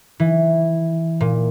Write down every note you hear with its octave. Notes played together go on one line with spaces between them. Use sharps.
E3
A#2